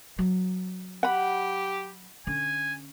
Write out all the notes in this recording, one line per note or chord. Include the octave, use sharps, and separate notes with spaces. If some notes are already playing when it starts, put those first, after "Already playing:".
F#3
G4 F#5 B5
D3 C#4 G#5